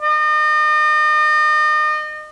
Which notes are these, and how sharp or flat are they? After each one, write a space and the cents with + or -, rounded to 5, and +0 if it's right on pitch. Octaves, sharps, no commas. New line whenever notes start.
D#5 -40